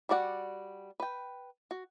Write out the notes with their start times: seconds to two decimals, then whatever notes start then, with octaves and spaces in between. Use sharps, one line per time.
0.09 G3 F#4 D5 F#5
1.00 B4 G5
1.71 F#4